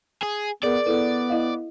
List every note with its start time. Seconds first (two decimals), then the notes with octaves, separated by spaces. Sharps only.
0.23 G#4
0.63 B3 G#4 A#4 D5
0.86 B3 E4 A4 B4
1.30 E4 D#5 F5